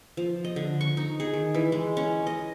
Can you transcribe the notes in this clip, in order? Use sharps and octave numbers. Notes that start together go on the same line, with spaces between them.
F3
D#5
D3
C#6
D#4
G#4
D#3
E3
G#3
C#4
D#5